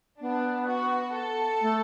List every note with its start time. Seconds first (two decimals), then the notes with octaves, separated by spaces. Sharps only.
0.21 B3 D4
0.68 F#4
1.15 A4
1.62 A3